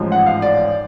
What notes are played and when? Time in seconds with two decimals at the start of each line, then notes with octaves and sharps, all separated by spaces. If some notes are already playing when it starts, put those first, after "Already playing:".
Already playing: A1 G#2 F3
0.12 F#5
0.26 F5
0.42 D5